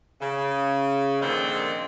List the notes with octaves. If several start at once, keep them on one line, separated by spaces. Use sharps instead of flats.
C#3
A#2 D3 D#3 F3 G#3 C4